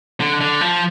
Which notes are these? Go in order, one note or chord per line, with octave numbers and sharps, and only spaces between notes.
D3
D3
F3